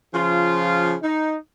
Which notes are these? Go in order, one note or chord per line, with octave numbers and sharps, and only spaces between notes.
C#3 F3 F4
D#4